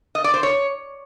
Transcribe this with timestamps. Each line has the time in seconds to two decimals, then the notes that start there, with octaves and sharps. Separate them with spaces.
0.15 D#5
0.24 D5
0.34 C5
0.43 C#5